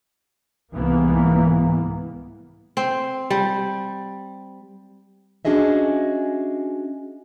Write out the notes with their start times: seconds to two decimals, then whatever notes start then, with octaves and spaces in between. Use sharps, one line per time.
0.74 C2 G#2 E3 A#3 B3
2.77 C4
3.30 G3
5.45 C#4 D4 F#4 G#4 D#5 E5